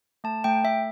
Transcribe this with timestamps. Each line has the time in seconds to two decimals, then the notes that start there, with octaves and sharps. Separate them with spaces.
0.24 A3 A5
0.44 A3 G5
0.64 A3 E5